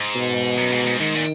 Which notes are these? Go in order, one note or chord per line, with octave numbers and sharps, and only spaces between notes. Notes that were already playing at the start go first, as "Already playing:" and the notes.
Already playing: G#2
B2
F#2
G#2
G#2
G#2 D#3
A#2